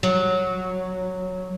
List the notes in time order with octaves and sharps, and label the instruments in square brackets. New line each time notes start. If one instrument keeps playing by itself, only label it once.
[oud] F#3